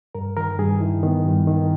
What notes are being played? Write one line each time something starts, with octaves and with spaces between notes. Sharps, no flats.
G2 A#4
D#3 A#4
G2 G#4
D#3 E4
D#3 B3
G2
D#3